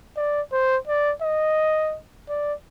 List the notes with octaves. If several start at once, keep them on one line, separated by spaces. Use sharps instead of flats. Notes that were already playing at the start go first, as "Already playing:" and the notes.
D5
C5
D5
D#5
D5